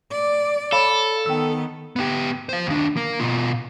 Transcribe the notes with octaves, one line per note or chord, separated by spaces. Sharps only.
D5
A4 C#5 F5 B5
D#3 B3 G5 E6
B3 G4
C5 F5
D#2 D4
A#3
B2 F4